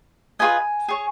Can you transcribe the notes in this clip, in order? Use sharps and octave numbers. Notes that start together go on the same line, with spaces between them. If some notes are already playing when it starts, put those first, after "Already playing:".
F4 G#4 B4 D#5 G#5
G#4 C#5